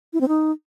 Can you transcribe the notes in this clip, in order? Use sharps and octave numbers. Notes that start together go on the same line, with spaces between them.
E4
C4
D#4